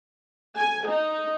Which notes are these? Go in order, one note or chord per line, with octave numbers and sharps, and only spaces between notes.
G#5
D#4